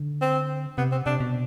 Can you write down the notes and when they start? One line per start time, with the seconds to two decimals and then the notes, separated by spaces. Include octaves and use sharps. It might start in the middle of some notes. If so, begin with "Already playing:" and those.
Already playing: D3
0.21 C4
0.78 C3 B3
0.92 C4
1.06 C3 D4
1.20 B2